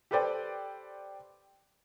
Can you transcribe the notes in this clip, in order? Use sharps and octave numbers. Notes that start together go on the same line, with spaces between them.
G4 A4 B4 C5 D5 G5